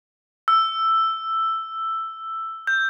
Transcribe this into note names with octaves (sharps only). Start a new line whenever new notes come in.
E6
G6